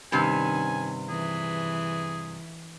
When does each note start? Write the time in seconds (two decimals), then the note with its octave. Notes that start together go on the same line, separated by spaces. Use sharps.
0.12 G2 C3 D#3 C#4 G#5
1.09 E3 G#4